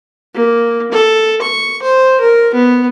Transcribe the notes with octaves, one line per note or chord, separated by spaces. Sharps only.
A#3
A4
C#6
C5
A#4
B3